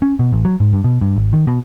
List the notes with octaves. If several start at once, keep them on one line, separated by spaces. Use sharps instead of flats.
C#4
B2
A1
F#3
G#2
G2
B2
G2
G#1
D#3
B2